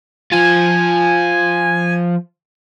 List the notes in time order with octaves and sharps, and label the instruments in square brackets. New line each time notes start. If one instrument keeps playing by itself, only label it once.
[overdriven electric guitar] F3 F4 [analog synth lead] G#5